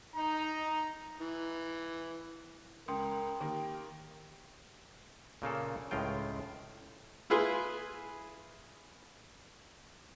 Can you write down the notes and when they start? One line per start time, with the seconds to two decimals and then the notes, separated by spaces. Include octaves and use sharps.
0.16 D#4 A#5
1.21 E3
2.88 C#2 A#4 G5 C6 D#6
3.41 D#3 A#3 G4
5.42 A#2 C#3 A#3 A4
5.91 C#2 A2 G#3 F4 G5
7.30 E4 F4 G#4 B4 C6